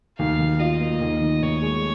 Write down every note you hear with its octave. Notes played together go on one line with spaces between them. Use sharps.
D#2 F5
D#3
F4 D#5
A#3
D#2
D#3
D#2 C#5
G#3